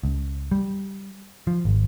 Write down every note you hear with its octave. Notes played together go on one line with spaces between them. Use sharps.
C#2
G3
F3
G#1